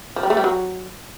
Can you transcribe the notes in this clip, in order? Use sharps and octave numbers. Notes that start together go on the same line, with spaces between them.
F3
G3
A3
G3
F#3